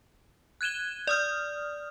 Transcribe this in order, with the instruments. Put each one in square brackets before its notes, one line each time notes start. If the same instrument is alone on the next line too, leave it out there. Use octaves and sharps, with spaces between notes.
[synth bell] F#6 G#6 D#7 E7 G7
D5 D#6 F6